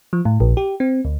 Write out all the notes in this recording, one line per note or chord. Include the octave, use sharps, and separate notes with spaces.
F3
A2
A#1
G4
C4
D2